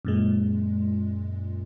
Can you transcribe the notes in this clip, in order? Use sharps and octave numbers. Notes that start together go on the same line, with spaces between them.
F#2 A#2 G#3